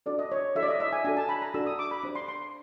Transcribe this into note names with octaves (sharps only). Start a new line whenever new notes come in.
D4 F#4 A4 D5
D#5
C#5
D4 F#4 A4 E5
D5
D#5
E5
G#5
D4 F#4 A4 G#5
A5
B5
A#5
D4 F#4 A4 E6
D#6
D6
B5
D4 G4 C5
C6
C6